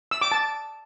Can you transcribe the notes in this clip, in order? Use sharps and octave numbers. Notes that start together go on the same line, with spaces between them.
E6
D6
A5